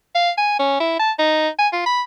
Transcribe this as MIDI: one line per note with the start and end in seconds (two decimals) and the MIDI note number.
0.15 0.30 77
0.38 0.57 80
0.60 0.78 61
0.80 0.97 64
1.00 1.12 81
1.19 1.49 63
1.59 1.68 80
1.73 1.84 65
1.86 2.02 83